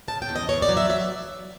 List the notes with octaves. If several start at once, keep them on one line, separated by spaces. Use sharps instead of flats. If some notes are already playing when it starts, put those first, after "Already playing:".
C#3 A5
G5
E2
D#5
E2 C#5
D5
F#3
E5
F#3 E5